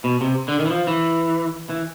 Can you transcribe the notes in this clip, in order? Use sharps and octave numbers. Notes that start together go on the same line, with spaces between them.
B2
C3
D3
D#3
E3
F3
E3
E3